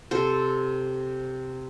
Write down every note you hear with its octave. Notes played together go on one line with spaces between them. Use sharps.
C3 A4 C5